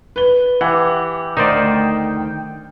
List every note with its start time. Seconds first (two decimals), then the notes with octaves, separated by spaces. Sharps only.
0.16 B4 G7
0.61 E3 G4 F#5
1.37 D2 D#3 D#4 C5 D5 G5